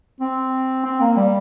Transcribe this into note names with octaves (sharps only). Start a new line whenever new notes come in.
C4
C4
A#3
G3